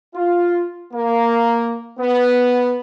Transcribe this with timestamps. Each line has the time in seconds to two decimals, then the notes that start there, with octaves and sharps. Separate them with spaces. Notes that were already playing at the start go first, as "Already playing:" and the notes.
0.15 F4
0.94 A#3
2.00 B3